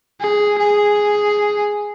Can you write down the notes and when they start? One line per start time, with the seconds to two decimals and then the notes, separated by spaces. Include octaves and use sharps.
0.21 G#4
0.58 G#4